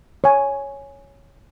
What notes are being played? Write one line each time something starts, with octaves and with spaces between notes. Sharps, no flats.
C#5 G#5